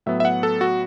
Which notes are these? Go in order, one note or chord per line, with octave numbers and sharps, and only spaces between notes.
A2 F#3 B3 E5
E5
F#5
A4
F#4